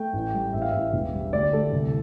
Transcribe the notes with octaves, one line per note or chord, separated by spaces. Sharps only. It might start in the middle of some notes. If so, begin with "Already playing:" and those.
Already playing: A3 G5
A1
G3
A1 E5
F5
A1 E5
E1
G3
D2 D5
D2 A4
C2